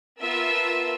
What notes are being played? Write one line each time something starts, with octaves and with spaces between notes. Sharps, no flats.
B3 F4 A#4 E5 A5 E6